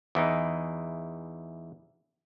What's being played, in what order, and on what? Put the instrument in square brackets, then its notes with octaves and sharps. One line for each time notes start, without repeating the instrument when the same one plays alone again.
[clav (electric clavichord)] E2 E3 D#4